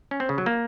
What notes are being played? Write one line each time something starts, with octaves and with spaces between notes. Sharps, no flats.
C#4
C4
C#3
F#3
A#3